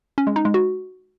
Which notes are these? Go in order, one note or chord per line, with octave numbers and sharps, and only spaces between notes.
C#4
G#3
D#4
G#3
F#4